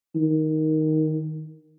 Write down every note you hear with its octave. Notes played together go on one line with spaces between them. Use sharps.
D#3